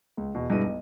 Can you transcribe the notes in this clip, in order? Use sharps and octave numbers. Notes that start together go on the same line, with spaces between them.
C#2
E2 B2
G2 B2 G#3 E4 B4 D#7
B1